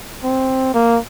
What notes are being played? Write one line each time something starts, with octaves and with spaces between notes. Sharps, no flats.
C4
A#3